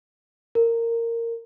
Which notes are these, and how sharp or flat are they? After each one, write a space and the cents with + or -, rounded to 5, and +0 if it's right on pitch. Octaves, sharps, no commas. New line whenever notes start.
A#4 -15